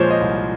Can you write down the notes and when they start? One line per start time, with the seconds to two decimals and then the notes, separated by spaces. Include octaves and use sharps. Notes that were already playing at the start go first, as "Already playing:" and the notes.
Already playing: A#2 F3 G#3 C5 C#5
0.10 D#5
0.21 C2